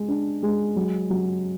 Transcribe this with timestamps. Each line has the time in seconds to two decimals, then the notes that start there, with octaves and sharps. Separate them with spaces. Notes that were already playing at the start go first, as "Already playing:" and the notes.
Already playing: G#3
0.08 D4
0.43 G#3
0.76 F#3
1.10 F#3